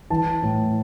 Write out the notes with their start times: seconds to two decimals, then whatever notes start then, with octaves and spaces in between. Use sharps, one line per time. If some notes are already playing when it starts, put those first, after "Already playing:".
0.10 E3 A5
0.42 A2